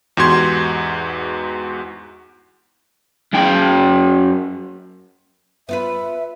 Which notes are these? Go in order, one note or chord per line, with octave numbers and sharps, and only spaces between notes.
E2 G#2 F#4 G4 C6 G#6
F#2 G5
B3 F4 B4 E5